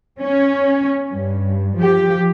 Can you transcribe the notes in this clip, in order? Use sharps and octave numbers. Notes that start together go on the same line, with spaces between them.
C#4
G2
F3 G4